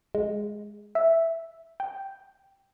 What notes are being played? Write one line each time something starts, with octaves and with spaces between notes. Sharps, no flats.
G#3
E5
G5